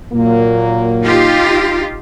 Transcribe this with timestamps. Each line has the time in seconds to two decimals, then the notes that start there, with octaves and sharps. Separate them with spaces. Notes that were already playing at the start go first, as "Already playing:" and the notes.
0.13 A#2 F#3 A#3
1.04 D#4 F4 G4